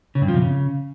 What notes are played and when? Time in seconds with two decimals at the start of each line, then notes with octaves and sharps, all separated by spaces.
0.15 C#3
0.22 G2
0.28 F3
0.35 C3
0.42 C#3